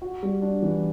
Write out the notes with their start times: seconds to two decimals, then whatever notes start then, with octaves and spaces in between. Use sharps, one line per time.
0.02 F#4
0.23 G3
0.42 D4
0.62 E3